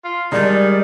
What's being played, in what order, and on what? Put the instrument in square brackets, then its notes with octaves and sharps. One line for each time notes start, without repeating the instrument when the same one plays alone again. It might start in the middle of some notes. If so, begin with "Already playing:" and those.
[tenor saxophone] F4
[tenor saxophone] D#3 [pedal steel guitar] G3 G#3 D#4 [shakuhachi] D5